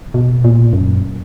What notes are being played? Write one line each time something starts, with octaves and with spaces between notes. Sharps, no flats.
B2
A#2
F#2